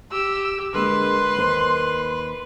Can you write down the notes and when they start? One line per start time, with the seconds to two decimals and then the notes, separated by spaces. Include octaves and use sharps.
0.11 G4 E6
0.74 D3 G#3 A#3 B4 C6
1.36 D#2 A#3 C5